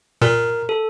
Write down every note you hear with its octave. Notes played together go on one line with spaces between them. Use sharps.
A#2 A#4
A4